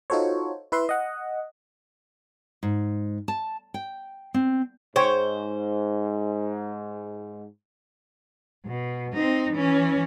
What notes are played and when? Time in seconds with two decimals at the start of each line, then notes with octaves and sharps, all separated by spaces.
0.10 D#4 F4 F#4 A4 C5 C#5
0.72 E4 B4 E5 C6
0.89 D#5 F#5
2.63 G#2
3.28 A5
3.74 G5
4.34 C4
4.96 G#2 C5 C#5 G5
8.66 B2
9.14 C4 D#4
9.52 E3 C#4